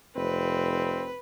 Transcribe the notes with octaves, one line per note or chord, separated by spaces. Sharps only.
F1 C4 B4